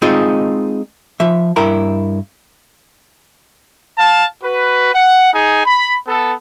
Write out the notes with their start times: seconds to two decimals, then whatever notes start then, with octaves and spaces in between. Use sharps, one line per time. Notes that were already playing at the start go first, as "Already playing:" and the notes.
0.02 G#3 C4 D#4 F4 G#4
1.20 F3 E5
1.56 G2 E4 A#4 A#5
3.98 F5 A5
4.42 F#4 B4
4.93 F#5
5.33 D#4 G#4 G#5
5.66 B5
6.07 B3 A4